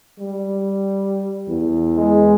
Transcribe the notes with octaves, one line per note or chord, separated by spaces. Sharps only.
G3
E2
G#3